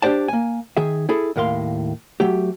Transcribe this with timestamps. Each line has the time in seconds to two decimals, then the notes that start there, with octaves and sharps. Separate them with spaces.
0.02 D4 G4 C5 D5 A5
0.28 A#3 G#5
0.77 D#3 G#4 E5
1.09 E4 G#4 A4
1.36 D#2 A2 A#4 F5 C6
2.20 F#3 A3 G4